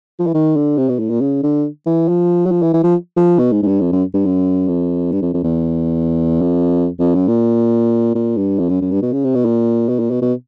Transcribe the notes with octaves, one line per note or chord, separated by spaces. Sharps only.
F3
E3
D#3
D3
C3
B2
A2
A#2
C#3
D3
E3
F3
F#3
F3
E3
E3
F3
F3
B2
G#2
G#2
G2
F2
F#2
G2
F#2
F2
G2
F2
F2
E2
F2
F2
F#2
A#2
A#2
G2
F2
F#2
F#2
G2
B2
C#3
C3
B2
A#2
B2
A#2
B2
B2